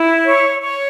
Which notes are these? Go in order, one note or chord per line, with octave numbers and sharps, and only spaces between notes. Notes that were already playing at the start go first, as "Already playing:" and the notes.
Already playing: E4
C#5
C#5